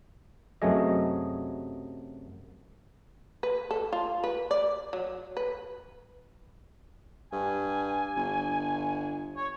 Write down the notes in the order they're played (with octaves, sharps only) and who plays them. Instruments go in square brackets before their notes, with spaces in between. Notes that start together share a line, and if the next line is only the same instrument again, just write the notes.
[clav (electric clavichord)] F#2 C3 F#3 A3 G#4 D#5
[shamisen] B4
A4
F4
B4
D5
F#3
B4
[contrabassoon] G2 [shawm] G#5
[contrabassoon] G1
[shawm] C#5